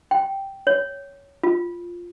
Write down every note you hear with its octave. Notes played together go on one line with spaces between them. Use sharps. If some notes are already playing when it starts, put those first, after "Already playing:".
G5
C#5
F4